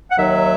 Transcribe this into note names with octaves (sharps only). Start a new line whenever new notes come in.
F#5
D#2 D#3 F#3 E5